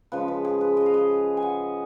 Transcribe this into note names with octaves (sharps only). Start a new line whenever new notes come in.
C#3 F3 G#3 B4
B4
G#4
B4
D#5
F5
D#5
G#5
F#5